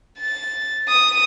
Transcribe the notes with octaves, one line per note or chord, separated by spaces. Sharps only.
A6
D#6